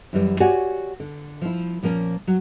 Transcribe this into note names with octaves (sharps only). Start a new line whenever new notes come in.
F#2 E3 G3
F#4 G4 C#5 D5 F#5 G#5
D3
F3 E4
A#2 F3 A#3 C#4
F#3